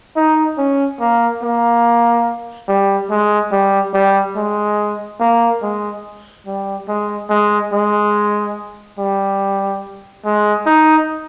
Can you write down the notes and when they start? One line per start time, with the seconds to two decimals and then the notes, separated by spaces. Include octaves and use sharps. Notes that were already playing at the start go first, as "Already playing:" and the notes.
0.16 D#4
0.58 C#4
1.00 A#3
1.43 A#3
2.68 G3
3.10 G#3
3.52 G3
3.94 G3
4.36 G#3
5.20 A#3
5.62 G#3
6.47 G3
6.89 G#3
7.30 G#3
7.73 G#3
8.99 G3
10.25 G#3
10.66 D#4